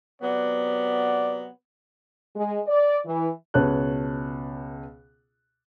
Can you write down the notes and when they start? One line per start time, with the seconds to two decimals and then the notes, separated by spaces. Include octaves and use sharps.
0.22 C3 F#3 B3 D5
2.36 G#3
2.67 D5
3.05 E3
3.54 C#2 B2 B4 C#5 A5 F#6